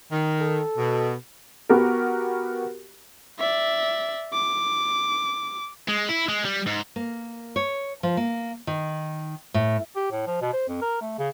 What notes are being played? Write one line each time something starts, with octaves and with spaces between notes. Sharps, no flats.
D#3
A4
B2
B3 F#4 G4 A#4
D5 E5
D6
G#3
E4
G#3
G3
G#2
A#3
C#5
F3
A#3
D#3
A2
G4
A2
F3
B2
C5
F2
A#4
A3
C#3